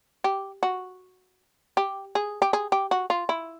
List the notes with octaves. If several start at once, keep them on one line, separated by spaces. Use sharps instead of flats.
G4
F#4
G4
G#4
G4
G#4
G4
F#4
F4
E4